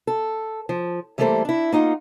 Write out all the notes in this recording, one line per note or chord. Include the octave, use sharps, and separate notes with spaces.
A4
F3
E3 G3 A3 A#3 A4 C5
D4 E4
A#3 D#4 F4 F#5